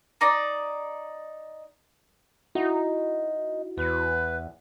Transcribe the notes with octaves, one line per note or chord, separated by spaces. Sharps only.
D#4 D5
D#4 E4 F#4
E2 B4